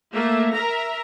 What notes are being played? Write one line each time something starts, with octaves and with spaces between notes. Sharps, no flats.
A3 A#3 E5
A#4 E5 A#5